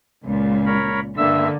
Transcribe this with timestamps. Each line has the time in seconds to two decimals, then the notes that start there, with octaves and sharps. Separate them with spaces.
0.24 C#2 A#2
0.66 A#4 C#5 B5
1.17 G2 D3 A#3 E5 E6